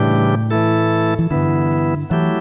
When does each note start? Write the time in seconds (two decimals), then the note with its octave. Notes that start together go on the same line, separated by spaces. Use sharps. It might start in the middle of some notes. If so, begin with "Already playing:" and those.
Already playing: A2 C#3 E3 G3 D4 G4
0.51 E3 A3 E4 A4
1.19 E3
1.31 G2 D3 E3 B3 E4
2.10 E3 F#3 A3 E4 G4